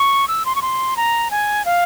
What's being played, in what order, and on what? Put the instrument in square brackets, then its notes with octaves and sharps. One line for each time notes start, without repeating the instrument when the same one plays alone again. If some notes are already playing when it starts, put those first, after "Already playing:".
Already playing: [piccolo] C#6
E6
C6
C#6
C6
A#5
G#5
F5